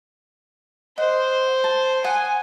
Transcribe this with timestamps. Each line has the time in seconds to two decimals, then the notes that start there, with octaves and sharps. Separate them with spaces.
0.98 C5 D#5 F#5
1.64 A5
2.04 F#5 G#5 D#6